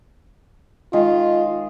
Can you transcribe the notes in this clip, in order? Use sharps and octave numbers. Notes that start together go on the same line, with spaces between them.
D#3 G#3 F4 G#4